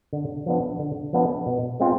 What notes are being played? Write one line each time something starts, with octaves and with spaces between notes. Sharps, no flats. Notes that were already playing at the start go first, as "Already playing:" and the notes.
D3
F3 B3 D4
D3
F3 B3 D4
B2
G#3 C4 F4